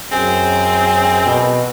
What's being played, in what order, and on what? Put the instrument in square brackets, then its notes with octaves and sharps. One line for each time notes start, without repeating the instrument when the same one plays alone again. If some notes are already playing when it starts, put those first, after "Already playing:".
[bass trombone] F#2 [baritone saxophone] C4 [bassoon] G#4
[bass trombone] B2